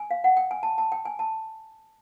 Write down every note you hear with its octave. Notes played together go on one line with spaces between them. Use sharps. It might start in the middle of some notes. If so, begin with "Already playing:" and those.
Already playing: G#5
F5
F#5
G5
G#5
A5
A5
G5
G#5
A5